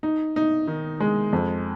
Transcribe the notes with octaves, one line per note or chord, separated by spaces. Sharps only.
D#4
D#4
D#3
G#3
F2